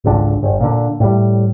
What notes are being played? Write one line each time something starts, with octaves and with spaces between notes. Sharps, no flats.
G#1 C#2 D3
G1
A#2 D3
A2 G3